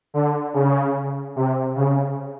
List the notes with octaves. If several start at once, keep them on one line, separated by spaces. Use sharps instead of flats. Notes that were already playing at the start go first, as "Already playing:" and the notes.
D3
C#3
C3
C#3